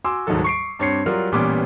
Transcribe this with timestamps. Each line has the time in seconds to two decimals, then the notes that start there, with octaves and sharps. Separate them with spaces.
0.04 F#4 G#5 C6 D6 E6
0.27 D#1 G#2 D#3 F3 F#3 A4
0.44 C#6 C7 D7
0.79 G2 C4 C#5 C#6 C7 C#7
1.06 F#3 G3 F4 A#4 D5
1.32 A1 A#2 G3 B3 C#4 D6